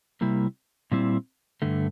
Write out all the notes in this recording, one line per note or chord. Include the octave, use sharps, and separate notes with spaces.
C3 G3 A#3 E4
A#2 G3 C4 E4
G2 D3 A3